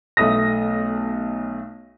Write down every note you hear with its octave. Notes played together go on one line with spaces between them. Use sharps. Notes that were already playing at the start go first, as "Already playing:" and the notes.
B1 A3 D#6 A#6